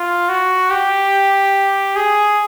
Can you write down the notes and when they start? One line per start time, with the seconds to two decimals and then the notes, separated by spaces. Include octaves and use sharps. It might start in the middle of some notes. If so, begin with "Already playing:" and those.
Already playing: F4
0.29 F#4
0.71 G4
1.96 G#4